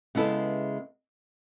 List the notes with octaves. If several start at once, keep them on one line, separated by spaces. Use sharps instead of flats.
C#3 G#3 B3 E4 A4